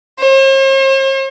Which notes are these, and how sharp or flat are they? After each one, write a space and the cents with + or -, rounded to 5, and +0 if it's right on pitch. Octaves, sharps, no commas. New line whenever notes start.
C5 +45